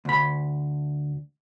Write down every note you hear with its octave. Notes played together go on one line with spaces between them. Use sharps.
D2 B5